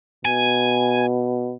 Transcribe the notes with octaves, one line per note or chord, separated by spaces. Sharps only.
B2 G#5